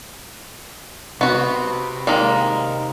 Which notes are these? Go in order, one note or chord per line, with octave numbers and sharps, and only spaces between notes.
C3 B3 F#4
D#3 G#3 A#3